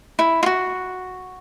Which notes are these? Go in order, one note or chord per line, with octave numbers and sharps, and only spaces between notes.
E4
F4
F#4